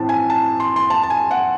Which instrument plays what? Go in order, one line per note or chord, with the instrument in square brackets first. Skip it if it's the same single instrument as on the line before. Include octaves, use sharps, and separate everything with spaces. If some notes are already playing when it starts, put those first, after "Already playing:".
Already playing: [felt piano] A2 E3 C4 A5
G#5
A5
C6
C6
A5
A5
G#5
F#5